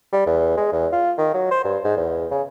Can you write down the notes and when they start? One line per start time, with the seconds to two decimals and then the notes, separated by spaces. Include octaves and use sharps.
0.12 G3
0.26 E2
0.57 G#3
0.72 E2
0.92 F4
1.18 D#3
1.34 F#3
1.51 C5
1.64 G2
1.84 G#2
1.97 E2
2.31 C#3